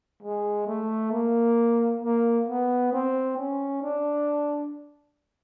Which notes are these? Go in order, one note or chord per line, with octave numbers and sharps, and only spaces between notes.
G#3
A3
A#3
A#3
B3
C4
C#4
D4